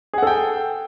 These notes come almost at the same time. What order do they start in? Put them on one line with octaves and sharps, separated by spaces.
G#4 F#5 A4 G5